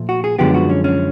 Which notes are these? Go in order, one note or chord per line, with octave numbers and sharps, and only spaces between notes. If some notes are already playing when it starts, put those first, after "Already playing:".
Already playing: A#2 F3 A3
F#4
G#4
F#2 D3 F3 G#3 B3 G4
F#4
C#4
C#4